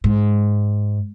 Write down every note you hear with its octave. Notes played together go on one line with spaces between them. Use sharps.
G#2